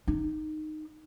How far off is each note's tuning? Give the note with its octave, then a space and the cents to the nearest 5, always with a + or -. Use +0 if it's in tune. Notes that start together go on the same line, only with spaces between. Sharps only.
D#4 -15